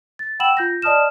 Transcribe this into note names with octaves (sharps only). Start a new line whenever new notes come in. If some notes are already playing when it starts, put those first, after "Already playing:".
A6
F#5 G5 B5 E6 E7 F#7
F4 G6 A#6
D5 D#5 A5 D#6 F6 E7